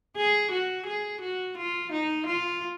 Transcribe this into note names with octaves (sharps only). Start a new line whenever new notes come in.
G#4
F#4
G#4
F#4
F4
D#4
F4